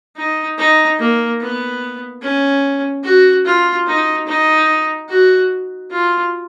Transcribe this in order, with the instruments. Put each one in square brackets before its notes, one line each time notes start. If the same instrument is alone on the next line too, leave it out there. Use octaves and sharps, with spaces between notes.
[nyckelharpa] D#4
D#4
A#3
B3
C#4
F#4
F4
D#4
D#4
F#4
F4